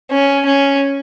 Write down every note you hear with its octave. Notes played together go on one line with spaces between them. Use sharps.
C#4
C#4